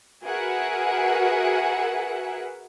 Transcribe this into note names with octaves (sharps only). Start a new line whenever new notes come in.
F#4 G#4 A#4 B4 E5 F#5